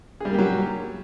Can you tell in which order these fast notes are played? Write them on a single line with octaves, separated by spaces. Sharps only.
G#4 G3 A#3 G4 F#3